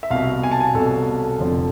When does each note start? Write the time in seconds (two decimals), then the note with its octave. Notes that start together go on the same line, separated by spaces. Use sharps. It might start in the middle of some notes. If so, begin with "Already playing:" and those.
0.03 E5
0.10 C2 B2 F5
0.43 G#5
0.51 A5
0.60 G#5
0.74 C2 B2 A4
1.39 F1 F2 D3 F3